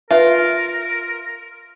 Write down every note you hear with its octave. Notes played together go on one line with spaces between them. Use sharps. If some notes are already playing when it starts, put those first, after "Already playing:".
F4 A#4 B4 E5